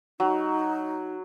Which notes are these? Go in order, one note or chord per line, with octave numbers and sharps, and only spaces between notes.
F#3 D#4